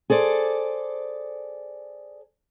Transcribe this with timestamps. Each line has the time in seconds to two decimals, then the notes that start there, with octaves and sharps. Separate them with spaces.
0.10 G#4 A4 C5 D5